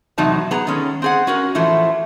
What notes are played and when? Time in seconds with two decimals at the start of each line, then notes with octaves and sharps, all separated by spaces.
0.18 E2 A2 C3 F#3 D#4 A5
0.51 B3 G#4 A#5
0.67 D#3 G#3 C#4 A4
1.02 C4 G#4 F#5
1.27 C#4 F#4 A#4
1.55 A2 E3 F3 A3